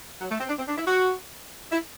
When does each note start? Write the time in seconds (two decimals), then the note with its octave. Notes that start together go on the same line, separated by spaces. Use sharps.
0.21 F#3
0.31 A3
0.40 C4
0.49 D4
0.59 C4
0.68 D4
0.78 E4
0.87 F#4
1.72 E4